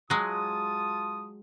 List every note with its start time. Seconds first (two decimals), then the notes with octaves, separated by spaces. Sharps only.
0.10 F#3 G#3 F4 A5 D#6